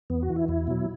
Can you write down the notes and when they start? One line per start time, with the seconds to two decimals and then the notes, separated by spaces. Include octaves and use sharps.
0.10 E2 B3
0.23 F#4
0.30 E3
0.36 E4
0.48 E2 E4
0.67 B2 F#3